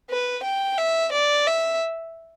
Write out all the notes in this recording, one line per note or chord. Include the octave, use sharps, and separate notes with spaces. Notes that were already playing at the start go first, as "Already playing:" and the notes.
B4
G5
E5
D5
E5